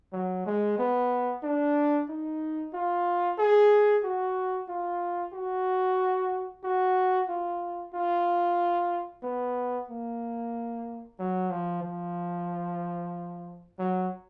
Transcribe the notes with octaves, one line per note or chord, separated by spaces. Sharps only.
F#3
G#3
B3
D4
D#4
F4
G#4
F#4
F4
F#4
F#4
F4
F4
B3
A#3
F#3
F3
F3
F#3